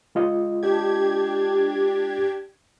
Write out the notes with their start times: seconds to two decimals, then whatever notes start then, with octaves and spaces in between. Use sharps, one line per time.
0.15 G#3 F4 D#5
0.63 D4 G4 G#6